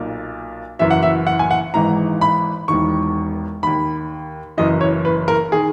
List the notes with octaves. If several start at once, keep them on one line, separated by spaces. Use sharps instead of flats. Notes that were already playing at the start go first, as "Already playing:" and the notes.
Already playing: B1 A#2
F#1 F#2 E3 E5
F#5
E5
F#5
G#5
F#5
G#1 G#2 E3 A#5
B5
E1 E2 D#3 C#6
D#2 D#3 B5
F#1 F#2 E3 D#5
C#5
B4
A#4
D#3 G#4